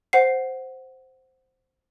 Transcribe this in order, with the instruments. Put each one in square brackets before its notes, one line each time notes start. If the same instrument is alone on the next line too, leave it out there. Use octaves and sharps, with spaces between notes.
[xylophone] C5 F#5 C7